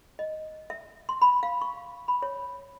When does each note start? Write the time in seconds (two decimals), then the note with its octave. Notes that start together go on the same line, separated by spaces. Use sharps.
0.19 D#5
0.70 E5
1.09 C6
1.22 B5
1.43 F5
1.62 C#6
2.08 B5
2.22 C#5